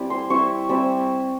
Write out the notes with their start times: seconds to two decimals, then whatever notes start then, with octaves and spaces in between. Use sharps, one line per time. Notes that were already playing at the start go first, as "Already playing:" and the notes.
Already playing: G3 C4 E4
0.10 C6
0.30 G3 C4 E4 C#6
0.69 G3 C4 E4